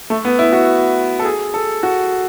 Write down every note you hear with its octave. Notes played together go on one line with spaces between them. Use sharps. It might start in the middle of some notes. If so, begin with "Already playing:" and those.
A3
B3
E4
F#4
A4
G#4
A4
F#4